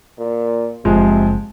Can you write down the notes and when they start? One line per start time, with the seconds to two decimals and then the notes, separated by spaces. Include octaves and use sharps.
0.19 A#2
0.85 F#1 C3 F3 G#3